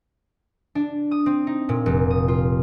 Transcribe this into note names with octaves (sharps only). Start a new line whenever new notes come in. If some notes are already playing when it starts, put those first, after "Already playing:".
D4
D#6
C4
D#4
A#2
F1
D#6
F4